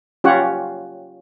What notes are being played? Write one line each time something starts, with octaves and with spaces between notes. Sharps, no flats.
C#4 F4 G4 C#5 F#5